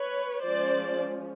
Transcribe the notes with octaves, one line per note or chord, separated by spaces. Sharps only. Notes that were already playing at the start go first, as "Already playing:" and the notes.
Already playing: B4 C#5
F3 G#3 C#4 C5 D5